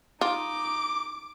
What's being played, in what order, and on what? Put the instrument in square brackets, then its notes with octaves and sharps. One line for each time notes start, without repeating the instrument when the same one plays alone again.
[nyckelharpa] D#4 [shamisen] F4 [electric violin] D6